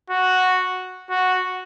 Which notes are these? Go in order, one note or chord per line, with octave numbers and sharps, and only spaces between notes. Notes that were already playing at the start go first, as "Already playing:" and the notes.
F#4
F#4